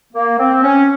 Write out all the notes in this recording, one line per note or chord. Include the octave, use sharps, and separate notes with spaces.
A#3
C4
C#4